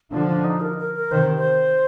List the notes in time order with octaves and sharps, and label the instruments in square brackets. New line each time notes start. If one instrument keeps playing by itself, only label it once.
[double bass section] D3 F3 [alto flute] D4
[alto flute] D4
D#4
A#4
A#4
A#4
[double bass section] C3 D#3 [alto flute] C5
[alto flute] C5